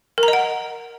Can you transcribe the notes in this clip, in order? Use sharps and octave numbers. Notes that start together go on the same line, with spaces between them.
A#4
A#5
D#5
F#5